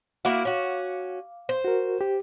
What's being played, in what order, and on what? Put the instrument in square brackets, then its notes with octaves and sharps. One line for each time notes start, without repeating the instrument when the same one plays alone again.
[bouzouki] A#3 E4 F#4 [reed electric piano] F5 D6
[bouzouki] C#4 F#4
C5
[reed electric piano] F#4 A#4
G4